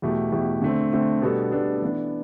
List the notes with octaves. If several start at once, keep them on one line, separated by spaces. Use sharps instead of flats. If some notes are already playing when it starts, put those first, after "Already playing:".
E2 B2 A3 E4 G4
E2 B2 A3 E4 G4
D3 A3 C4
D3 A3 C4
B2 G3 B3 D4 A4
B2 G3 B3 D4 A4
E3 B3 D4